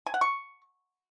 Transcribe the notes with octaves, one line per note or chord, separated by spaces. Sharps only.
G#5
F#5
C#6